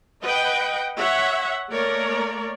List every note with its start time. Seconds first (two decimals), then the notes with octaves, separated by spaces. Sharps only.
0.21 B4 D#5 F#5 G5
0.97 C#5 E5 F#5
1.71 A3 A#3 A#4 C#5 D5